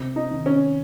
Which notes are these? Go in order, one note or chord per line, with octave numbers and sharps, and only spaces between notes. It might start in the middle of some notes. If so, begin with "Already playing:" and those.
Already playing: C3
D#4
D#3
C#4